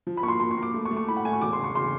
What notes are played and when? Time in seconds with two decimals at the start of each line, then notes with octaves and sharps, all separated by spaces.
0.07 F3
0.17 B5
0.23 A#3 C#6
0.28 C6
0.40 A#3 C6
0.51 C#6
0.57 A#3
0.63 D6
0.74 A3
0.85 C#6
0.91 A3
0.97 C#6
1.08 A2 B5
1.17 F#5
1.25 A3 G#5
1.33 C#6
1.41 E1 D6
1.53 C6
1.59 C#3 C#6
1.75 C#3 C6